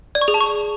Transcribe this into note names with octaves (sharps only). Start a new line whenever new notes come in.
D5
C#6
G#4
A5
C#6